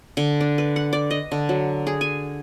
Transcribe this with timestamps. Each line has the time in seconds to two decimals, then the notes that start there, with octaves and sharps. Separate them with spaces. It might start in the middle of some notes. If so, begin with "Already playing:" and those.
0.17 D3
0.41 D4
0.58 B4
0.76 F#5
0.93 D5
1.11 D#5
1.32 D3
1.49 F#3
1.87 G#4
2.01 G#5